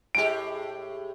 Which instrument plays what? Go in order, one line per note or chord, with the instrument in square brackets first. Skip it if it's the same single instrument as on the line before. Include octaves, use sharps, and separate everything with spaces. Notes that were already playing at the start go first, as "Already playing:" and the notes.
[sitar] A2 G#3 G4 [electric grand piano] D7